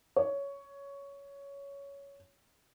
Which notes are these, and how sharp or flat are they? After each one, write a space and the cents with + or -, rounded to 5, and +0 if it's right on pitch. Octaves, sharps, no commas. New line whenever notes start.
C#5 +10